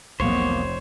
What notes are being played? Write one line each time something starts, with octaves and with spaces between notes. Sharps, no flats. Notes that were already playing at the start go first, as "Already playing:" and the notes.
F1 C2 E3 F#3 A#3 B3 C5 C#5